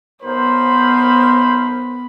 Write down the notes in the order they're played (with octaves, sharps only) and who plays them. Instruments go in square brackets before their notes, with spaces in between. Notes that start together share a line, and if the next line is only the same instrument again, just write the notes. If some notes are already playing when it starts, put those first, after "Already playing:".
[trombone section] B1 A#4 C5 [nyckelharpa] B3 B5